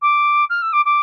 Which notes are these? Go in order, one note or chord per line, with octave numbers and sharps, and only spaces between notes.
D6
F6
E6
D6
D6